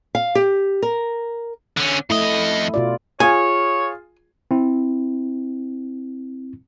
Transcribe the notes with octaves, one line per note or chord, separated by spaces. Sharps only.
F5
G4
A#4
D3 C#4
F2 A3 E4 D#5
B2 F4 D5
F4 G#4 C#5 G#5
C4 E4